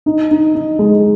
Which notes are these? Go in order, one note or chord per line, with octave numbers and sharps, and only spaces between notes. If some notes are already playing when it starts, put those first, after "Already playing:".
D#4
D#4
D#4
G#3